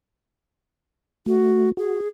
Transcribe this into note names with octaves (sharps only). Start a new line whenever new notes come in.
A3 F#4
F#4 G#4